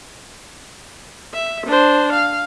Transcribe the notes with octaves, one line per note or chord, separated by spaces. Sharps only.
E5
D4 C5
F5